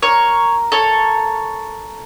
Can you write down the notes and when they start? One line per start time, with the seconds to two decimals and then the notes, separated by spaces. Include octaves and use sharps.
0.02 A#4 C#5
0.72 A4 C#5